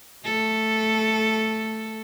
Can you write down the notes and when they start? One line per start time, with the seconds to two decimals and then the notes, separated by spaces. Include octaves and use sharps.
0.24 A3 A4